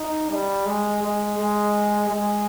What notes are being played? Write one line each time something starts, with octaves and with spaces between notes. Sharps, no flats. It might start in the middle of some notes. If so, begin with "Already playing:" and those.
Already playing: D#4
G3
G#3
G#3
G#3
G#3